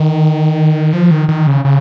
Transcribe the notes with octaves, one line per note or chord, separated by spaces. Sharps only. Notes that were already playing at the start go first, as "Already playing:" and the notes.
Already playing: D#3
F3
D#3
D#3
C#3
C#3